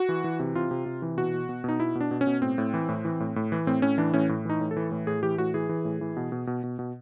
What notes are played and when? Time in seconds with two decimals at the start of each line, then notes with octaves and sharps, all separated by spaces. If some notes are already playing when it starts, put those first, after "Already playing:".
Already playing: F#4
0.09 E3
0.24 E3
0.40 C3
0.55 C3 F4
0.71 C3
0.86 C3
1.02 E3
1.17 B2 F#4
1.34 B2
1.49 B2
1.64 B2 D#4
1.80 B2 E4
1.95 B2
2.01 D4
2.11 B2
2.21 C#4
2.27 B2
2.42 A2 C4
2.58 A2
2.74 E3
2.89 A2
3.05 E3
3.20 A2
3.36 A2
3.52 E3
3.67 A2 C4
3.82 A2 C#4
3.98 E3 D4
4.14 A2 C#4
4.29 A2
4.45 E3 D#4
4.61 A2
4.71 A4
4.77 E3
4.92 A2
5.07 A2 G#4
5.23 E3 G4
5.38 A2 F#4
5.54 E3 G#4
5.69 E3
5.85 A2
6.01 E3
6.17 B2
6.32 B2
6.47 B2
6.64 B2
6.79 B2